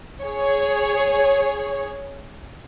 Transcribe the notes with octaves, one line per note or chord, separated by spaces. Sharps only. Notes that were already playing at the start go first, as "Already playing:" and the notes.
G#4 C#5